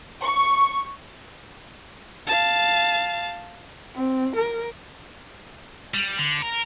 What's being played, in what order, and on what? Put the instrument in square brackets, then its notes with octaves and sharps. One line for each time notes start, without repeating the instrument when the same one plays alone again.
[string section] C#6
[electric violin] F5 A5
[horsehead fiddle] C4
A#4
[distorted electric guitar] G3
D3
A#4